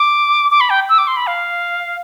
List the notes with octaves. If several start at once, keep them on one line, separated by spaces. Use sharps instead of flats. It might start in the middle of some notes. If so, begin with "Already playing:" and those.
Already playing: D6
D6
B5
G5
E6
D6
C6
B5
F5